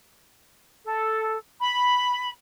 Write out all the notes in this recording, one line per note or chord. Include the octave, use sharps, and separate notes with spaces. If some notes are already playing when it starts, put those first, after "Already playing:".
A4
B5